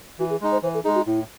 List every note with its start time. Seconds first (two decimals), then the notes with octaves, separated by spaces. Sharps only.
0.19 E3 F#4
0.30 G#4
0.41 G#3 D#4
0.52 C5
0.63 E3 C5
0.74 A4
0.84 G#3 D#4 G#4
0.95 F#4
1.06 A2 E4